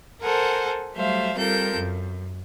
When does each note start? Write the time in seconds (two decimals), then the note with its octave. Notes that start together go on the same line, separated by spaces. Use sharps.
0.22 A4 A#4 C5 F#5 G#5
0.94 F#3 G3 A3 C5 E5 F5
1.37 G3 C4 F4 A4 A#4 G6
1.76 F#2